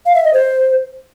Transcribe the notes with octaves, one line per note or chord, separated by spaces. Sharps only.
F5
E5
D#5
C5